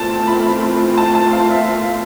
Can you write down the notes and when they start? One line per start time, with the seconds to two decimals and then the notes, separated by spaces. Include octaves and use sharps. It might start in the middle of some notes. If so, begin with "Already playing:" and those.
Already playing: E3 A3 C4 F4 A5
0.27 B5
0.98 A5
1.15 A5
1.33 F5
1.50 E5